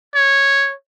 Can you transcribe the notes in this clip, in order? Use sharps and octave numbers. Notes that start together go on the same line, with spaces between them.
C#5